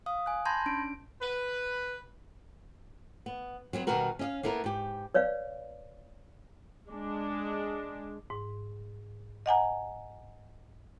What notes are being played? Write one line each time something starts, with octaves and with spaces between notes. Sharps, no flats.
F5 D#6
G#5 F#6
A5 B5 C6 G6 G#6 A#6
C#4 D4 D7
B4
B3
F#3 G3 B3 C4
B2 D#3 G3 F#4 A#4 B4
C#4 D#5 F5
A#3 B3 E4 A4 A#4
G#2 G4
B4 C#5 D5 F5
G#3 D4
G#2
D#5 F#5 G#5 A#5